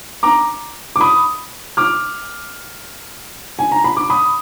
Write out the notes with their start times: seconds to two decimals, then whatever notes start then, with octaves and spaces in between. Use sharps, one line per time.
0.23 A#5 D6
0.96 D6
1.01 B5 D#6
1.77 D6 F6
3.59 G#5
3.72 A#5
3.84 B5
3.97 D6
4.10 B5 D#6